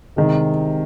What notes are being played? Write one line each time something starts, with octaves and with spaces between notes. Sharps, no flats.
C2 C3 D#3 G#3